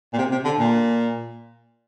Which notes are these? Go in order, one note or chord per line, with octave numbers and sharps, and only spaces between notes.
A#2
C3
C3
D3
A#2